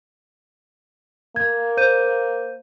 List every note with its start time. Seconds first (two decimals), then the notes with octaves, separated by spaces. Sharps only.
1.36 A#3 G#6
1.77 C5 G6 D#7